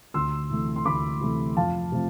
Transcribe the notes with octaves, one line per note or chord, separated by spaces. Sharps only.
D2 C6 E6
C3 E3 A3
C6
D2 B5 D6
C3 E3 A3
F2 F5 A5
C3 F3 A3